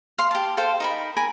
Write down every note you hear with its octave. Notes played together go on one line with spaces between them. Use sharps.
F5 C6
G4 A5
A4 C5 F5 G5
D#4 A#4 B5
A#4 G#5 B5